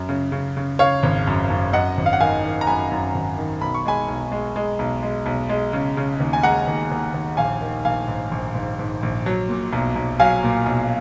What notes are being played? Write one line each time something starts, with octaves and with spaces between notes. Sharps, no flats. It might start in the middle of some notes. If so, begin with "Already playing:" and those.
Already playing: F#2
C#3
C#3
C#3
C#3 C#5 F5
G#1
F#2
F#2
F#2 D#5 F#5
G#1
F5
F#5
D#3 F5 G#5
D#3
A#5
F#2 G#5 B5
F#2
G#1
D#3
B1 B5
C#6
G#3 G#5 B5
B1
G#3
G#3
B1
G#3
B1
G#3
C#3
C#3
D#2
G#5
G#3 F#5 A#5
D#2
D#2
D#2
A#1 F5 G#5
D#3
A#1 F5 G#5
G#2
A#1
G#2
G#2
A#1
F#3
A#2
B1
B1
F#3 F5 G#5
A#2
B1